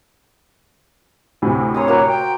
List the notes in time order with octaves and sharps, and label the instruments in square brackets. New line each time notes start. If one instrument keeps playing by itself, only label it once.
[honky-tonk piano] D2 A2 C3
[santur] C5 A#5 D#6 [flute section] C#5
[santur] A#3 F#4
[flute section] G5 [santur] A#5